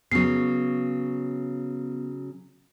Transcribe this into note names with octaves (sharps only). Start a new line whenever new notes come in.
C#3 F#3 B3 C7